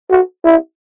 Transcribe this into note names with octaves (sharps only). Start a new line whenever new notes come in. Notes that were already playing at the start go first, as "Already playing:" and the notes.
F#4
E4